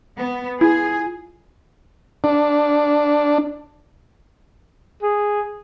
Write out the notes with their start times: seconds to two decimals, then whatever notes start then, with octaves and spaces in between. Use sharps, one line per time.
0.17 B3
0.61 E4 F4 G#4 G#6
2.24 D4
5.03 G#4